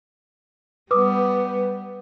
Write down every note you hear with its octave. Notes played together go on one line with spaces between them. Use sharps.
G3 B3 B4 D6 D#6